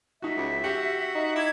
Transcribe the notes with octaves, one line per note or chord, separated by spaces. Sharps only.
D#4 F#4 E5
C#2
F#4 G4
D#4
E4 D6 G#6